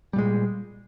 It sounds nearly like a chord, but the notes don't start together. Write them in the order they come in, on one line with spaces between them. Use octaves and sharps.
G3 A#2 G#3